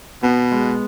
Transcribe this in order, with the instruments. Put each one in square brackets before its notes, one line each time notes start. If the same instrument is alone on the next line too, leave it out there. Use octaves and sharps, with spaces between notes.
[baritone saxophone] B2 [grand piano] B3
[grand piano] G#3